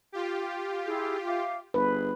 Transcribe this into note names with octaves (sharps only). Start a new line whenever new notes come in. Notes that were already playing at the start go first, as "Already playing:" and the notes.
F4 G4
E4 G#4
E5 F5 D6
G1 G#4 B4